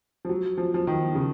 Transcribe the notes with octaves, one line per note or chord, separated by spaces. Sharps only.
F3
F#3
F3
F3
D#3
C#3